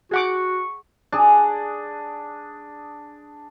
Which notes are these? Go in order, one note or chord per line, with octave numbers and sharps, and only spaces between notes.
F#4 G#4 F#5 C#6 D6
D4 G#4